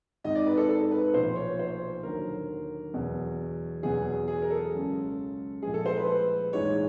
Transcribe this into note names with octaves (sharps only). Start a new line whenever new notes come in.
G#1 G#2 D#3 D#5
D5
B4
A4
A4
B4
B1 A#2 F3 C5
C#5
C5
D#2 D3 F#3 A#4
E2 B2 F#3
E2 B2 F#3 G#4
G#4
A#4
A4
C#2 C#3 F#3
A#1 A2 F3 G#3 G#4
A4
C5
B4
A#1 G#2 E3 G#3 C#5